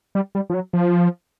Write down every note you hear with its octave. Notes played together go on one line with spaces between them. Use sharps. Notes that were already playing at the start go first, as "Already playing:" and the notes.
G3
G3
F3
F#3
F3